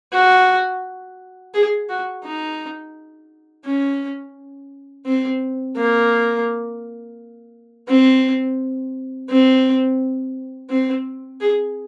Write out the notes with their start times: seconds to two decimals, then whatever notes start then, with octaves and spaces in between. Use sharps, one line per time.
0.13 F#4
1.54 G#4
1.89 F#4
2.25 D#4
3.65 C#4
5.06 C4
5.77 A#3
7.88 C4
9.30 C4
10.70 C4
11.40 G#4